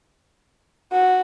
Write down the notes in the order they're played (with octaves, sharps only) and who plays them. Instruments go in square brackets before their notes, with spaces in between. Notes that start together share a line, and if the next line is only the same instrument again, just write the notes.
[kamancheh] F#4